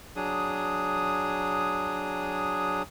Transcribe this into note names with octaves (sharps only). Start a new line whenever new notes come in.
F#3 D4 G#4 D#6